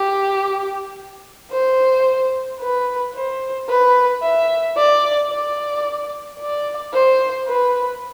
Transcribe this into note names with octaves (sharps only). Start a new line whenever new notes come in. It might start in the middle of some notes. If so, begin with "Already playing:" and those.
Already playing: G4
C5
B4
C5
B4
E5
D5
D5
D5
C5
B4